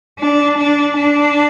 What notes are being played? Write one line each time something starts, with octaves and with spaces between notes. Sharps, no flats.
D4
D4
D4